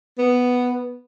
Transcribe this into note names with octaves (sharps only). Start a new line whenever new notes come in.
B3